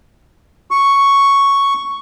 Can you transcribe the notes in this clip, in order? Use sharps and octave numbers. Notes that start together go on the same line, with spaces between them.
C#6